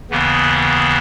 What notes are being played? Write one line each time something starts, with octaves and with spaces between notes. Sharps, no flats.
D#2 C#3 E3 B3